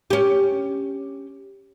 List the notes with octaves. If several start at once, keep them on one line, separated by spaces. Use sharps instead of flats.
C#4 G4